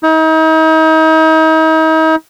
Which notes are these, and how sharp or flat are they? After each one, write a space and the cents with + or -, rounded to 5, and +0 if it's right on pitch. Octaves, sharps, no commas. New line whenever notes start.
D#4 +40